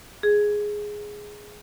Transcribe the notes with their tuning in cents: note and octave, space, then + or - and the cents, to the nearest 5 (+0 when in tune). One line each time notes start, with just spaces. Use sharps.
G#4 +0